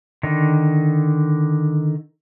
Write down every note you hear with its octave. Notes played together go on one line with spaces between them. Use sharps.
D3 D#3